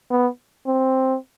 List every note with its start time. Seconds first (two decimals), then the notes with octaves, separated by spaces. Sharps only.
0.11 B3
0.67 C4